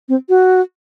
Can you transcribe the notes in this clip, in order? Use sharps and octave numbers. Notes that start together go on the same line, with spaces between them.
C4
F#4